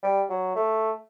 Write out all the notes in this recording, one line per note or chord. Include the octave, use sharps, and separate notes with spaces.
G3
F#3
A3